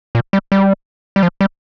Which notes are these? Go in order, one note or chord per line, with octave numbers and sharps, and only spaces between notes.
A#2
G3
G3
G3
F3
G3